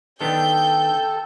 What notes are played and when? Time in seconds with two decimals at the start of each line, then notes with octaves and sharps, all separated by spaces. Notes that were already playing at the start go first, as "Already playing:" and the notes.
0.21 D#3 B3 D4 A4 G5 G6